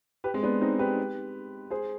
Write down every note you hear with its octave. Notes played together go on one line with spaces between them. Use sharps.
G4 B4
G#3 C4
B3 D4
C4 D#4
G4 B4
G#4 C5